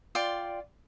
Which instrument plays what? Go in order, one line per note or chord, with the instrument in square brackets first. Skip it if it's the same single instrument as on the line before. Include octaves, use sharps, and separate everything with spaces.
[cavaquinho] F4 D5 G5 C6